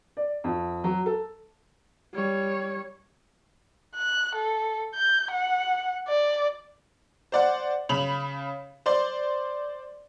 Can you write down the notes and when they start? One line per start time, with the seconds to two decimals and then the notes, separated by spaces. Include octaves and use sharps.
0.17 D5
0.44 F2
0.84 F#3
1.06 A4
2.14 G3 C#5
3.96 F#6
4.36 A4
4.95 G6
5.31 F#5
6.08 D5
7.32 C5 D5 F#5
7.89 C#3 B5 F7 F#7
8.86 C5 D5 C6